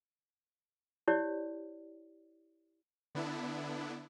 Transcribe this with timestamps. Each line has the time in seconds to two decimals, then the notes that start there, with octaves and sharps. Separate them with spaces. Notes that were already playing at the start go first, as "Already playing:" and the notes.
1.08 E4 G4 C#5 D5
3.15 D3 B3 D4 E4